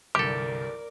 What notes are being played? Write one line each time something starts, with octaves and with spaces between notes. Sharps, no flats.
G1 C2 G4 A4 A#4 D5 D6